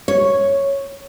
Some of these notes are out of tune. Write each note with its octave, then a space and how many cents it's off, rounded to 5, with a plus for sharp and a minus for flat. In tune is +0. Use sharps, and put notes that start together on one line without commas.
C#5 -5